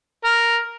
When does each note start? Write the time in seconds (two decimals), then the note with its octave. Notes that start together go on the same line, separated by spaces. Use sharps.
0.24 A#4